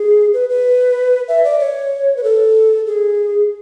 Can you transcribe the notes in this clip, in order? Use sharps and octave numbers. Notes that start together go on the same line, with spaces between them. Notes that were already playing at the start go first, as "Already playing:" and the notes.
Already playing: G#4
B4
B4
E5
D5
C#5
B4
A4
G#4